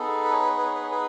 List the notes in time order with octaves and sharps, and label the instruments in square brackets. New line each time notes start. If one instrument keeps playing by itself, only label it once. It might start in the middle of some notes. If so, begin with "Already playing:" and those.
Already playing: [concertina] B3 D#4 G#4 A4
B4
C#5
B4
C#5
B4
C#5
B4
C#5
G#4 B4